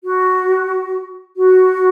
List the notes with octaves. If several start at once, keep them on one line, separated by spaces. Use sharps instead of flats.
F#4
F#4